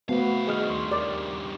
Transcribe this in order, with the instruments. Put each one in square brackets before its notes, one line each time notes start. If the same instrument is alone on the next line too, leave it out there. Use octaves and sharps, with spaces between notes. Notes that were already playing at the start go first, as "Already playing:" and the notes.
[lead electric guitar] C3 F5 [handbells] A3 F#4 C5 [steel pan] B3
[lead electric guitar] G2 D#3 [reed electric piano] G#4 D#5 F6
[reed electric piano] D#2 C6 C#6
[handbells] G4 A#4 C#5 [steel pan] D5